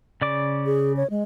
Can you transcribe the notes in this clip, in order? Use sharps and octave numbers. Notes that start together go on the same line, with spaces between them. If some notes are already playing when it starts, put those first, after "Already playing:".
C#3 D5 D6
G#4
C#5
G#3